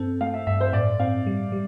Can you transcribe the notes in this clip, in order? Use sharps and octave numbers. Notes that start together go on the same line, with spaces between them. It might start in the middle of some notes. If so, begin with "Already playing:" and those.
Already playing: G2 C4 A4
A3 F5
E5
G2 E5
C5
A2 D5
C4 F5
G3
G3